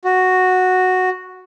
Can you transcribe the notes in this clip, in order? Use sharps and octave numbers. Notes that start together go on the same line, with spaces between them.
F#4